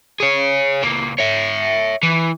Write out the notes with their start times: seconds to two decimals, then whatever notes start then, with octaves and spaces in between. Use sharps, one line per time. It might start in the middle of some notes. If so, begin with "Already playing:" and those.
0.20 G#4 C#5
0.83 C#2 A#3
1.19 C#5 E5
2.03 E3